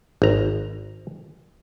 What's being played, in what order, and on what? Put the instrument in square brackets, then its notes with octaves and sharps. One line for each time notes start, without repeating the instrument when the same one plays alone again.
[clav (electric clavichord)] G#1 A#5